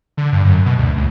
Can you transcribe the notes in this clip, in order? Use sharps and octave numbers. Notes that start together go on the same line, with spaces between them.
D3
G2
F#2
B2
D2
C#2